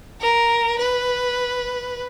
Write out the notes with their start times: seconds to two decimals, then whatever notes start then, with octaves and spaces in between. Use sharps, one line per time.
0.21 A#4
0.79 B4